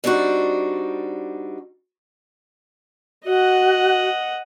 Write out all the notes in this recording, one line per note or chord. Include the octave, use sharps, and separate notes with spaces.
G3 C4 D4 D#4 F#4
F#4 D#5 F#5